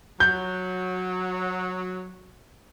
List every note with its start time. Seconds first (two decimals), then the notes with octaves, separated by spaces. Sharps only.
0.20 F#3 G6